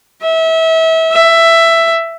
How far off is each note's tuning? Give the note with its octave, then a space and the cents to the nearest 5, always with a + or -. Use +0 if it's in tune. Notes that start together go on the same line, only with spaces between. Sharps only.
E5 -30
E5 +10